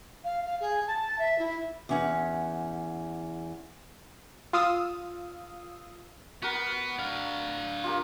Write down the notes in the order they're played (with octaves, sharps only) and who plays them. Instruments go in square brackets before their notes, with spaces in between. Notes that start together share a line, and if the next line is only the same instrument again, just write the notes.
[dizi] F5
F5
G#4
A5
E5
E4
[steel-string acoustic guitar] E2 C#4 F#5
[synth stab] F4 F5 D#6 E6
[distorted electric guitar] B3 [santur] F#4 A#4
[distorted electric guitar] D4 F5
[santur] F4 G4 A#4